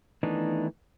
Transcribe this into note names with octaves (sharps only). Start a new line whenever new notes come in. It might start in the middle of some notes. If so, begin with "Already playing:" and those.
D#3 E3 A3 B3 D4 D#4